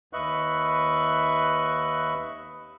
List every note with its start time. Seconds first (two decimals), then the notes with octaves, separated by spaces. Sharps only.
0.13 D#2 B4 D#5 E5 C#6 F#6